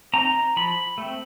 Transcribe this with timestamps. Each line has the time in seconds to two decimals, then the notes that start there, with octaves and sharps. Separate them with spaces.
0.14 C4 D#4 A#5
0.56 F3 B5
0.98 A3 C4